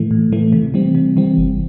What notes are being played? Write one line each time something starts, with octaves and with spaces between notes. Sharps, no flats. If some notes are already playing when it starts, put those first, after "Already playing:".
Already playing: A2 E3 A3
A2
E3 A3
C3
E3 G3 C4
C3
E3 G3 C4
G1